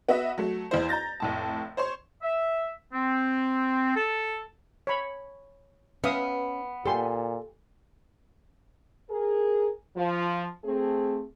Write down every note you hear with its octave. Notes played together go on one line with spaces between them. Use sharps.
B3 F#4 D#5 E5
F#3 A3
E2 E4 C5
A#5 G6 A6 A#6
F1 A2 A5
C5 C#5 C6
E5
C4
A4
C#5 B5
B3 C#4 E5 F5 D#6
A#2 G4 A4 G#5 C6
G#4 A#4
F3
A3 C4 G#4